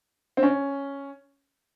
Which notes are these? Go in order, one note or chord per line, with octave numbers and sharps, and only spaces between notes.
C4
C#4